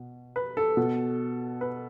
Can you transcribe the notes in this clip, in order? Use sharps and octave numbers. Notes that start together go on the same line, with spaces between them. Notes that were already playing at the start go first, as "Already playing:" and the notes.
Already playing: B2
B4
A4
B2
B4